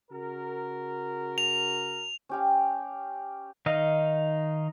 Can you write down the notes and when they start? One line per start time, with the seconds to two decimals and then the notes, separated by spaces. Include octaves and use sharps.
0.11 C#3 F#4 A#4
1.38 F7
2.29 C#4 G4 F5
3.66 D#3 D#4 D#5 F5